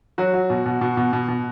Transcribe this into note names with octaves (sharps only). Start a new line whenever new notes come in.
F#3 F#4
F#3
B2
B2
B2
B2
B2
B2